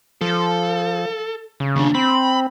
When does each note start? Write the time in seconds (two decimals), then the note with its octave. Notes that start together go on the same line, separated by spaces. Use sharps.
0.21 F3 A4
1.60 C#3
1.76 D#2 D4
1.95 C4 B5